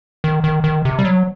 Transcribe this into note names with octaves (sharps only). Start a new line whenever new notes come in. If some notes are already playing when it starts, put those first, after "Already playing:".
D#3
D#3
D#3
C3
G3
F#3